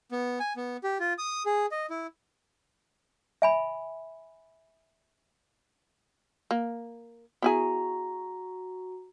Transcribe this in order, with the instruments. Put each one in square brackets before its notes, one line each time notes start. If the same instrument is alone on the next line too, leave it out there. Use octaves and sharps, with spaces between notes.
[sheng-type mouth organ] B3
G#5
B3
G4
F4
D#6
G#4
D#5
E4
[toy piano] E5 G#5 B5
[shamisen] A#3
[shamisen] B3 E4 G#4 [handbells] F#4 A#5